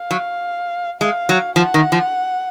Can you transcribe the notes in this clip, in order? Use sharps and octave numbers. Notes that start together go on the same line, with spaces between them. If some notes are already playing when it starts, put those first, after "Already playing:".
Already playing: F5
F#3
G#3 F5
F#3
F3 F#5
D#3
F3